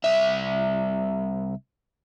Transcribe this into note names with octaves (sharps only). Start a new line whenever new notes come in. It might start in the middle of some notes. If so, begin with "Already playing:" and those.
C2 E5